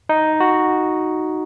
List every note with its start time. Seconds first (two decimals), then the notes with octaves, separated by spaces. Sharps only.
0.09 D#4
0.40 F#4